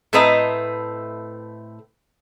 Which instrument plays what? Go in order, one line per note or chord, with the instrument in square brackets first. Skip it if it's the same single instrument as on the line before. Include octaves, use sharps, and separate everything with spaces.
[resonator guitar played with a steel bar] A2 A3 C4 B4 D#5 A#5